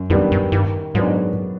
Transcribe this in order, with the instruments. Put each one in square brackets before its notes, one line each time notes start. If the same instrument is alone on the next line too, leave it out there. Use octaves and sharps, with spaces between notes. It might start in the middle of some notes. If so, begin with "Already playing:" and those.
Already playing: [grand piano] F#2
[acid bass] F2 [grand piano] D#3 G3 B3 D4
[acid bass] F#2
[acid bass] G2 [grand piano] D#3
[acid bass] G#2 [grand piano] F#3 B3 D4